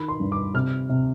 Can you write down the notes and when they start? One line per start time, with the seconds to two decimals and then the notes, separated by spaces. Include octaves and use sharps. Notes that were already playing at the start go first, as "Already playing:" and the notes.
Already playing: D#3 B5
0.08 C6
0.20 G2
0.32 D6
0.54 C3 F6
0.89 C3